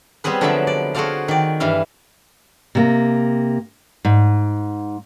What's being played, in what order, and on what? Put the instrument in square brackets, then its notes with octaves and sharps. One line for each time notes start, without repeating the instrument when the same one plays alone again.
[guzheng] G3 B3 C4 G#4 B4
D3 F3 F#3 D5 E5 B5
D5
F#4 G#4 A4 C5 D5 F5
D#3 D5
G2 E3 E5 F5
[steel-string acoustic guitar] C3 A#3
G#2